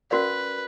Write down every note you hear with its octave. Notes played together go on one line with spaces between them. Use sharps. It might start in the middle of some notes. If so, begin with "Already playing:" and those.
C#4 F#4 A#4 B4 D5 F5